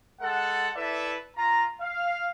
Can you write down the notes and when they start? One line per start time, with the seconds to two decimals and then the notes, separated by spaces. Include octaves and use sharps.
0.21 G#3 A4 F#5
0.76 E4 A4 B4 D5 E5
1.36 F4 A#5
1.81 F5